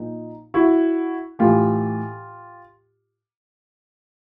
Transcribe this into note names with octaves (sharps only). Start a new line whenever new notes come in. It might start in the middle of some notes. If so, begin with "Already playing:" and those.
Already playing: A#2 F3 D#4
E4 F#4
A2 E3 F4 G4